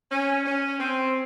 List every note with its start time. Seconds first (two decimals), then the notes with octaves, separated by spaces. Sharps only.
0.11 C#4
0.46 C#4
0.80 C4